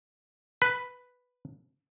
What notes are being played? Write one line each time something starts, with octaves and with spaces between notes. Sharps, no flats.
B4